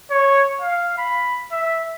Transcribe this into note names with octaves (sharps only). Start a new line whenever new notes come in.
C#5
F5
B5
E5